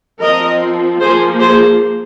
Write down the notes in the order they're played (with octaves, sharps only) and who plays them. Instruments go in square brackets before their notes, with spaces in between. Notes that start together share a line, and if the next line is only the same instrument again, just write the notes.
[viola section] F3 C4 A#4 D#5
F3 A#3 G#4 C5
G#4 C5